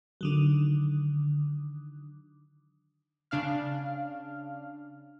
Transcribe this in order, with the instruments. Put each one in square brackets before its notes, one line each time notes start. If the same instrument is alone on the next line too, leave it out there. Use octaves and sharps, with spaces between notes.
[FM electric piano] D3 D#3 F#3
[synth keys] C#3 D4 F5 F6